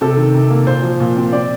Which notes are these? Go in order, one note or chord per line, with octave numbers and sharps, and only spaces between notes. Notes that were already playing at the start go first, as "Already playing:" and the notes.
C3 A4
D#3
C3
A#3
A#2 C5
F3
A#2
C4
C4 D5